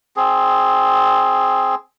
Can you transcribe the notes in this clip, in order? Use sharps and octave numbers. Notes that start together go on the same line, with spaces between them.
C4 G#4